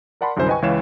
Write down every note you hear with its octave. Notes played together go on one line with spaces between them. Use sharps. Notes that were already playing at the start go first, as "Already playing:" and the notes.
A#4 D5 F#5 A5 B5 C6
C2 F#2 D3 E4 C5 G#5
B4 D#5 G5 G#5 C#6
C#2 E3 C#5 F5 E7